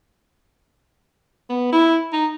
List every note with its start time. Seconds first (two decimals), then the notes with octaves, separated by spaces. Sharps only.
1.50 B3
1.73 E4
2.13 D#4